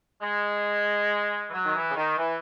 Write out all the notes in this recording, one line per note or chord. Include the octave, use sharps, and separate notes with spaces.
G#3
E3
F#3
D#3
E3
C#3
D#3
E3